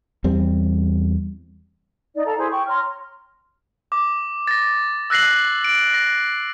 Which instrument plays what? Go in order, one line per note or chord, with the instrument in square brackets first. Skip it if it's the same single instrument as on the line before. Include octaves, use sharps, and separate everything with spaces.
[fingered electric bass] E2 G3 C4
[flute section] D#4 D5
A4 F5 A#5
E4 G#4 C5
G5 C#6
C#5 A#5 C6 F6
[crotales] D6
A6 A#6
E6 F#6 A#6 C7 F#7
D7
A#6